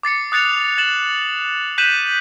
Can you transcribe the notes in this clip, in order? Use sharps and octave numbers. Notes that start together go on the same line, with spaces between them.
D6 A6 C7 C#7
D#6 F#6 A6 C#7 F7
A6 E7 F#7
F#6 G6 B6 D#7 E7 F#7